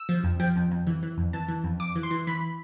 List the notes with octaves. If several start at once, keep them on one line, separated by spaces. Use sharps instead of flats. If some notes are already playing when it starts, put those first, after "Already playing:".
Already playing: E6
F3
F2
F3 G5
F2
F2
E3
E3
F2
E3 A5
E3
F2
F2 D6
E3
C6
E3
E3 B5